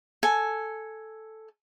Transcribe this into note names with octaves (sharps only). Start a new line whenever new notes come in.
A4 G#5